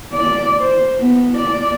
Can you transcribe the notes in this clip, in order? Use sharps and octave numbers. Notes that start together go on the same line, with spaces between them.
D5
C5
B3
D5